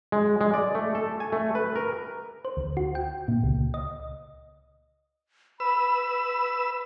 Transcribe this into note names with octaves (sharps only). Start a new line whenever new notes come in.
G#3
G#3
D5
A3
A4
G#5
A3
B4
A#4
C5
D2
F#4
G5
A#2
C#2
D#5
B4 B5 E6